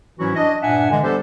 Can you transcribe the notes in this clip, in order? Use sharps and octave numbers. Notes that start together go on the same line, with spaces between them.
G#2 E3 F#3 C#4 E4 F#4
D4 D#5
G2 A#2 D4 E5 F#5 G#5
D3 E3 G#3
G3 B3 D4 G4 A4 C5